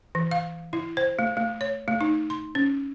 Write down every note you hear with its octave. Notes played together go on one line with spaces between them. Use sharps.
E3
F5
E4
C5
A3
A3
C#5
A3
D#4
C6
C#4